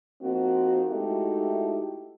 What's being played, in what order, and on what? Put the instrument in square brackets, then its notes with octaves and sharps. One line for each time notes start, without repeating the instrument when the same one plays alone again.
[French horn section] F3 A#3 C4 D#4 F#4
G#3 A3 D#4 E4 F#4 G4